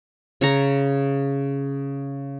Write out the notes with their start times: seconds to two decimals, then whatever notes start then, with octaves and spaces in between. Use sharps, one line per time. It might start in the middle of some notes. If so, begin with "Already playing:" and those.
0.41 C#3 C#5 A#5